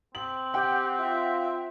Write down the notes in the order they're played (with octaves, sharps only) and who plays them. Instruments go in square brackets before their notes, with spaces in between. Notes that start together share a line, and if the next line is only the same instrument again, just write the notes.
[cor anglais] C4 [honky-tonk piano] F#7
[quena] G4 [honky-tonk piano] F#5 G5
[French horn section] F4 [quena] E5